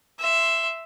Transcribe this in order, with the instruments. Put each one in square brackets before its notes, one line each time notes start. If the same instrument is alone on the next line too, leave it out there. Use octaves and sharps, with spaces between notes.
[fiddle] E5 C6